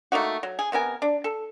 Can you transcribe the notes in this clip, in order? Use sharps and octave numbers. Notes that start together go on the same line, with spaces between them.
A3 A#3 D#4 F#4
F#3
G#4
C3 B3 A#4 G#5
D4
A4